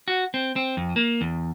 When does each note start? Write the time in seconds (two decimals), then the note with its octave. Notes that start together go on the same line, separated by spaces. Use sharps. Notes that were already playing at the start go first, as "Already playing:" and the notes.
0.08 F#4
0.34 C4
0.56 C4
0.77 F2
0.96 A#3
1.21 E2